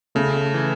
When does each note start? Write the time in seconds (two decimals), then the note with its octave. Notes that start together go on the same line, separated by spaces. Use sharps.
0.15 C#3 A3
0.54 E3